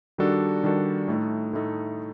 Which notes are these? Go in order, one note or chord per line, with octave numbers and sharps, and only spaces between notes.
D#3 G3 D4 F#4 A4
D#3 G3 D4 F#4 A4
A2 A3 D#4 A4
A2 A3 D#4 A4